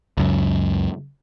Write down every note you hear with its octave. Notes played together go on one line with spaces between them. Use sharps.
C#2 F#2